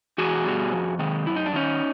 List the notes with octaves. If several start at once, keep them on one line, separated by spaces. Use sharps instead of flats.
E2 F#4 G#4
B2 G3
F2
C3 D#3 G#3
F#2 E4
D#4
D4
D#3 F#3 C#4 D#4